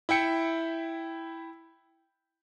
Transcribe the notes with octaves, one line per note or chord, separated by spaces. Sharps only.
E4 E5 G5 C#7